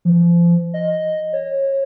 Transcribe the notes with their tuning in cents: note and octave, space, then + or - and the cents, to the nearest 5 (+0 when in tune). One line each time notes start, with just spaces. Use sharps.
F3 -30
D#5 +0
C#5 -25